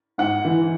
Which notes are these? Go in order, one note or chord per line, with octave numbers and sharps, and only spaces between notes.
G#2 F#5
E3